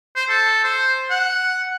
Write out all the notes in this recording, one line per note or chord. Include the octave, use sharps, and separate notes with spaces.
C5
A4
C5
F#5